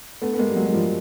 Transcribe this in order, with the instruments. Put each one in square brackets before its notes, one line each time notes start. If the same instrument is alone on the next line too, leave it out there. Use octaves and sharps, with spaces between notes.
[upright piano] A3 B3
B3
G#3 A#3
G3
F#3 G#3
G#3
F3 G3